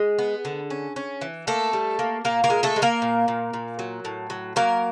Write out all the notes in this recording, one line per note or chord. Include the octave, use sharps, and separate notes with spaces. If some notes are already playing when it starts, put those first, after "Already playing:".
Already playing: G#3 G#4
B3
D3
C#4
C#4
E3
A3 A#3 A4
G3
A#3
A#2 A#3 A#4
A#3 A#4
G#3
A3 A4
G#3
A#3 A#4
A#2
A#2
A#2
F#3
A2
F#3
F#3 A#3 A#4